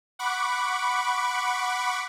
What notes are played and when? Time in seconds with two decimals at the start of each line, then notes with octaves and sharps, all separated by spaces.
0.19 F#5 B5 C#6 D6